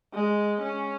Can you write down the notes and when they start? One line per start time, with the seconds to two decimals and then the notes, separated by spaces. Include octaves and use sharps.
0.14 G#3
0.61 C#4